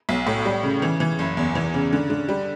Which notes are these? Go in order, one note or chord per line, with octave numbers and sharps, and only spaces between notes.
B1
A2
G3
C#3
E3
E3
F#1
E2
E3
C#3
D3
D3
G3